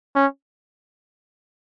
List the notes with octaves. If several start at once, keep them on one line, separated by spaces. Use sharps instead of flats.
C#4